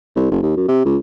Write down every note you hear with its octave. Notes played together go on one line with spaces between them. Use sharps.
C2
F#1
D#2
F#2
C3
C#2